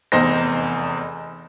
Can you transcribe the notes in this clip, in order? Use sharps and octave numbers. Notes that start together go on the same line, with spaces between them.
F1 E2 D#4 C5 A#6